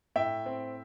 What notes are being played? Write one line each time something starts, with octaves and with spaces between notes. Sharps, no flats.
A2 E5 G5
C4